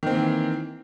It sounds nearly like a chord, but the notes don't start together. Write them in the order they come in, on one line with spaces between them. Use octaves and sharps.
D#3 C4 A#3 E3